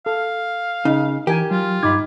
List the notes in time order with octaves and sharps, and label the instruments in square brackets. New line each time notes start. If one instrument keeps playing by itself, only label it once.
[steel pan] A4 [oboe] F5
[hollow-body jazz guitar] C#3 [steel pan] D#4
[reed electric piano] E3 [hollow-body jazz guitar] G4 [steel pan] A#4 G#5
[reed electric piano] F#3 [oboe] F4
[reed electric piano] G2 D6 G#6 [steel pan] D#4 B5